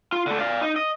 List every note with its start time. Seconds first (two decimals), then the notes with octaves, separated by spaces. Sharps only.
0.12 F4
0.27 D3 A3
0.39 D5 F5
0.61 D#4
0.76 D#5